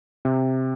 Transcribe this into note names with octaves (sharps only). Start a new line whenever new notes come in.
C3